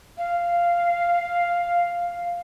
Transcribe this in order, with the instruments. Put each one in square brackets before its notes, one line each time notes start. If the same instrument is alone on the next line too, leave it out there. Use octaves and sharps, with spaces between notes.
[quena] F5